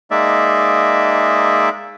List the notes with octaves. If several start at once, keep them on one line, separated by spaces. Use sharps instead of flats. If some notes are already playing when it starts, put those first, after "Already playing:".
G#3 A#3 D#4 D5 E5